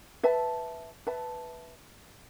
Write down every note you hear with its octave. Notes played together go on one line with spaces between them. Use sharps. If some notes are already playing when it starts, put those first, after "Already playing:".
B4 E5 A5
B4 E5 A5